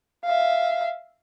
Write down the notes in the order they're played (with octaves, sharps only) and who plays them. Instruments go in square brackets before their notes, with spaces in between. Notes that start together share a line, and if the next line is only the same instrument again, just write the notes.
[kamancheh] E5 F5